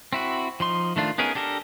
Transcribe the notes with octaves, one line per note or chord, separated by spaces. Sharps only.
C4 E4 F#4
F3 D#4 C6
D#3 A3 D4 F4
B3 C#4 D#4 G#4 A#4
D4 G4 A4 A#4